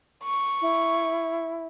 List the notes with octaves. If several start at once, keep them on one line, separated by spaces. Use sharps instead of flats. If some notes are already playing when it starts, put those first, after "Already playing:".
C#6
E4